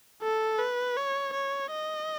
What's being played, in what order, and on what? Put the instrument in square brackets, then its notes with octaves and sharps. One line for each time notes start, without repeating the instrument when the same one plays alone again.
[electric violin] A4
B4
C#5
C#5
D#5